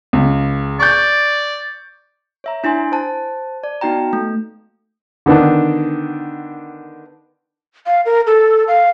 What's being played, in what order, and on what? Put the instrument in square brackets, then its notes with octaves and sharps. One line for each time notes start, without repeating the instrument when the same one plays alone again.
[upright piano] C#2
[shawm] D5 [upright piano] C#6 G6
[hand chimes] C#5 E5 A#5
D4 E4 G#5 C6
C5 A5
D5
B3 D#4 F#4 G5 A#5
A3
[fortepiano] D3 D#3 B3 D4
[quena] F5
A#4
A4
F5